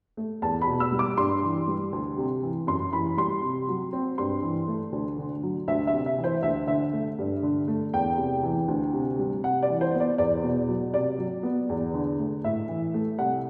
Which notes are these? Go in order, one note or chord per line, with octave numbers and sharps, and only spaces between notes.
A3
E2 A5
B5
B2
E6
G3
D6
G2 C6
E3
G3
D2
C3
E3
F#2 C6
E3 B5
G3 C6
C3
F#3
C4
G2 C6
E3
A3
D2
D3
F#3
D2 E5
E5
C3
E5
E3
C5
D2 E5
D3 E5
A3
G2
D3
A3
E2 G5
C3
E3
D2
C3
G3
C3 F#5
D5
E3
C5
B3
D5
E2 D5
B2
F#3
C3 D5
F#3
B3
E2
D3
A3
A2 E5
E3
A3
C2 F#5